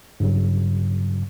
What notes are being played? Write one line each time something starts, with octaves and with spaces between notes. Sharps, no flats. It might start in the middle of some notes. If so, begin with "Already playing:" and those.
G2 C#3 F#3